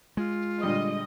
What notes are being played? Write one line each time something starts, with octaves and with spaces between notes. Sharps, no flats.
G#3 F4
A#2 D3 G3 D#5